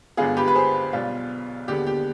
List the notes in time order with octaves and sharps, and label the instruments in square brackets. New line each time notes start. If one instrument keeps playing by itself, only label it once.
[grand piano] G1 G2 D3 G#3 B3 F4 G#4
G4 B4
B4
G#4 C5
B1 B2 G3 F4
D#2 D3 G#3 B3 G4
G4